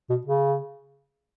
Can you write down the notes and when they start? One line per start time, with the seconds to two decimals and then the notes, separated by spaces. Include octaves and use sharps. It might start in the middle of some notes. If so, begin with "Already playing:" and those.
0.09 B2
0.26 C#3